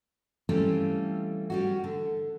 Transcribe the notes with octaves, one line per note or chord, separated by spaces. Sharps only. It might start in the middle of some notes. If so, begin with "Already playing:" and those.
E3 G3 A3 C4 C#4 F4
G3 C#4 F#4
D3